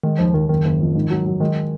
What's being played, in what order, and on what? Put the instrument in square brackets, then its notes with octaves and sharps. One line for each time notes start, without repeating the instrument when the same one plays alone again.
[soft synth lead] D#3 [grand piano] G#3
[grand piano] D#2 [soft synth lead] F3
[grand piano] D#2 [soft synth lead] D#3
[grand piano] F#1 [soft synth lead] D#3
[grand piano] F#1
F2
G#2
F#3
F#3
[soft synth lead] D#3 [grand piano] G#3